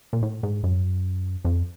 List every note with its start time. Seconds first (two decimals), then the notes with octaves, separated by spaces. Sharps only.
0.13 A#2
0.23 A2
0.43 G#2
0.63 F#2
1.45 F2